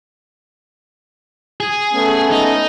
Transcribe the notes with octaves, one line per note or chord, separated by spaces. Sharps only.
G#4
A3 B3 C#4
D#4